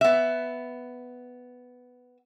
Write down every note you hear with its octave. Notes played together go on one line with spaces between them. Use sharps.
B3 E5